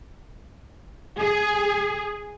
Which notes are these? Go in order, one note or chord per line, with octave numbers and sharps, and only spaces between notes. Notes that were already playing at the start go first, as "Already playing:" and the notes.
G#4